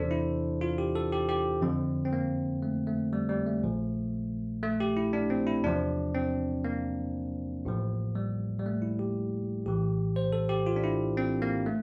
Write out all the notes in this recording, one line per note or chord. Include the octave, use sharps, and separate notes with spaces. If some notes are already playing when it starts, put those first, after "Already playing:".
Already playing: E2 C3 E3 D4 A4 C5
E4
F4
G4
A4
G4
G4
F2 D3 F3 C4
C4
A#3
A3
A3
G3
G3
A3
A#1 A#2 F3
A3
G4
E4
D4
C4
E4
E2 C3 F3 D4
C4
A#3
A1 A2 F3
G3
G3
A3
E4
G4
A#1 A2 E3 G4
C5
A4
G4
F4
D4
E4
C4
A#3
A3